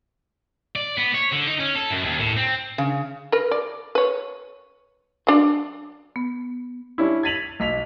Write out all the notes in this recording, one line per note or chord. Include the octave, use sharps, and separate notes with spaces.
D5
B3
C#5
D3
D#4
C#4
A4
F#2
D#2
A2
C4
C#3
A#4 B4
D5
B4 C#5
F#3 D4 D5
B3
G3 C#4 D4 E4
G#6 A6 B6 D#7 F7 F#7
B1 B6 F7